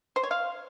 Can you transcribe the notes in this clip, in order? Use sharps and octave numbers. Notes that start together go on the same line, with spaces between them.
C5
C#5
F5